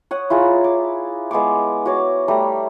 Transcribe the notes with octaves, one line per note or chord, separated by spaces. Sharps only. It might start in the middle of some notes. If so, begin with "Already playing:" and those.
C#5 F#5 D#6
E4 F4 G#4 A#5
D6
G#3 B3 C#6 D6
F#4 C#5 D6
G3 A3 A#5